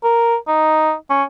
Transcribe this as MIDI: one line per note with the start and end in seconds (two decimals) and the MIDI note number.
0.04 0.36 70
0.48 0.94 63
1.10 1.23 61